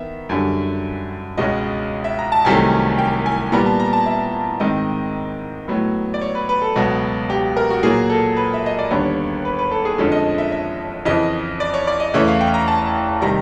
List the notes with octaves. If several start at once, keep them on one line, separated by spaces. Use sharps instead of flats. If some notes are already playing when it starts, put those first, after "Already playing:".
Already playing: D#3 B3 E5
F#2 D3 G3
C#2 B2 G#3 C#4 D#5
E5
A#5
A5
C2 C3 D#3 F#3 A3 G#5
G5
G#5
A#2 G3 B3 A#5
A5
A#5
A5
E5
G#2 D#3 G#3 C4 D#5
A2 F#3 B3
D5
C#5
B4
B4
A4
C#2 B2 F#3 B3
G4
A#4
F#4
A#2 F#3 A#3 G#4
A4
B4
E5
D#5
D5
D#2 D3 G3 B3 C#5
B4
B4
A4
G#4
F2 D3 F3 G#3 C#4 A4
D#5
E5
E5
F2 C#3 E3 D#5
D5
C#5
D5
D#5
E2 C#3 E3 A3 C#4 E5
F5
G5
A#5
A5
C3 D#3 G3 A#5